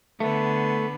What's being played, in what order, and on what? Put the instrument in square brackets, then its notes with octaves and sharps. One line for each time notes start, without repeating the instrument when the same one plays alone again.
[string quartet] D3 B3 [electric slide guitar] A3